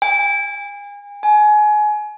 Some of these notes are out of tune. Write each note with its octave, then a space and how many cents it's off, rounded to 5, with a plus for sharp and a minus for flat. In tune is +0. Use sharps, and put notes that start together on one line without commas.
G#5 -35
G#5 +25